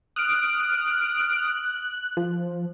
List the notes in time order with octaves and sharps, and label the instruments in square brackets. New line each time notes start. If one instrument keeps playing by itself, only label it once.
[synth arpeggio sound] D#6 F6 D7 [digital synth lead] F#6
[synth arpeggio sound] F3